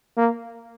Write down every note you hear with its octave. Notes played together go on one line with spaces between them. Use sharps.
A#3